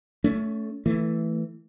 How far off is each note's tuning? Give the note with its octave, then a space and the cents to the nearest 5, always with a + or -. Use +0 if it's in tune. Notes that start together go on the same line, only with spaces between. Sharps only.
A3 +0 C#4 +25
E3 +0 A3 +10